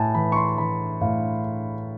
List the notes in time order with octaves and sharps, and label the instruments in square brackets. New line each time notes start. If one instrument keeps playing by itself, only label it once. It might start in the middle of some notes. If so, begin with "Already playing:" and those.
Already playing: [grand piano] A2 G#5 A5
E3 B5
C#6
C6
E3 B5
A2 F5